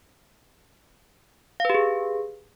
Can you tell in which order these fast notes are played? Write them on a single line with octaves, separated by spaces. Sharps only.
F5 B4 G4 G#4